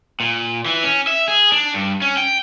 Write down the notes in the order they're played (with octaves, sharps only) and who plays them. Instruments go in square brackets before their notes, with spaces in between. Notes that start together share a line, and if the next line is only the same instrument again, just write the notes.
[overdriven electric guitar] A#2
E3
C#4
E5
G#4
D4
G2
C#4
G5